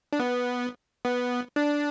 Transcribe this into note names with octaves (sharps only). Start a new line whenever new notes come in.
D4
B3
B3
D4